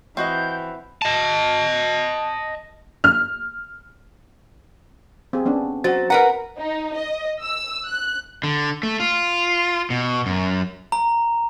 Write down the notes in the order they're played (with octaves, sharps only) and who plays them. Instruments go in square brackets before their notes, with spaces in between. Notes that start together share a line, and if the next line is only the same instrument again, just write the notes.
[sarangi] E3 [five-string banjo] C4 F#4 D#5 [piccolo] G6
[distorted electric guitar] D#5 A5
[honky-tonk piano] F6
[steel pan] C4 G#4
B3 C#4 D4
[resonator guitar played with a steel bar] F#3 [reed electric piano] F#4 C5 A6
[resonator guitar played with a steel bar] A#4 B4 F#5 [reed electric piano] A#5
[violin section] D#4
D#5
E6
F#6
[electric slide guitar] D3
A3
F4
B2
F#2
[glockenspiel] A#5